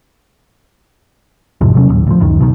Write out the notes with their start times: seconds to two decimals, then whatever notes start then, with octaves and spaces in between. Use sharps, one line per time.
1.61 E2 G#2 C3 F3
1.75 C3 F#3 C#4
1.88 D#1 A1 D#2
2.07 D2 F3
2.20 C#2 F#2 D#3
2.39 B1 B2 D#3